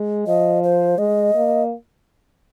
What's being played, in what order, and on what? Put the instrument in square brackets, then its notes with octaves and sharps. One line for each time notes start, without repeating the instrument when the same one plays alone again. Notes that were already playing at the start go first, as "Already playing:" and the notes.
Already playing: [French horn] G#3
[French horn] F3 [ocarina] D#5
[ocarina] C5
[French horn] G#3 [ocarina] D#5
[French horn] A#3